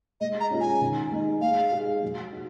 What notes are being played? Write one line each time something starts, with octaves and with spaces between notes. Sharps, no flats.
G#3 D#5
A#5
C#4 F4 G#4
G#5
D#3
G#3 D#4
G#3 F5
D#4 G#4
F#3
F#4